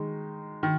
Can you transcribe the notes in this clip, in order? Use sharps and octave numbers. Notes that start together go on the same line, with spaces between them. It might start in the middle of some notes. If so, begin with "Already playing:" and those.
Already playing: D#3 G#3 D#4
D#3